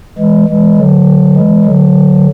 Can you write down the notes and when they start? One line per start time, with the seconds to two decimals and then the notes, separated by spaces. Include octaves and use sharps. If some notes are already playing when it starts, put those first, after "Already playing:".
0.18 E3 G#3
0.48 E3 G#3
0.77 D3 F#3
1.36 E3 G#3
1.65 D3 F#3